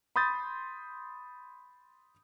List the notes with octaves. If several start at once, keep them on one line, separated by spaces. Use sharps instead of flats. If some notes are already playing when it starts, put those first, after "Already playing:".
B5 C6 D#6 G6 A6